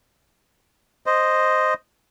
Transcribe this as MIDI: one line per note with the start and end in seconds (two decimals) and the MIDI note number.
1.06 1.74 72
1.06 1.74 75